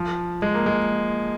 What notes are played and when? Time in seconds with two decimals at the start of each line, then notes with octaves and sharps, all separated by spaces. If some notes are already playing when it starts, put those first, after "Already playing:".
Already playing: F3
0.42 G#3
0.54 A#3
0.66 G#3